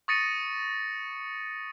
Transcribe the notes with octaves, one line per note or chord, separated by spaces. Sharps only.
C#6 D#6 A6 A#6 C#7 D#7